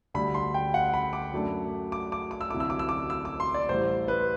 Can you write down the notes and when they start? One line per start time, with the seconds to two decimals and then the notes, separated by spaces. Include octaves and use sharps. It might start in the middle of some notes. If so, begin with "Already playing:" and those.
0.14 D2 D3 G3 B5
0.34 C6
0.54 G5
0.74 F#5
0.94 B5
1.13 D6
1.32 F#2 F#3 A3 D4
1.92 D6
2.12 D6
2.31 D6
2.41 E6
2.50 D2 C3 F#3 A3 E4 D6
2.60 E6
2.70 D6
2.79 E6
2.89 D6
3.10 E6
3.25 D6
3.40 C6
3.54 D5
3.69 A1 A2 G3 C5
4.08 B4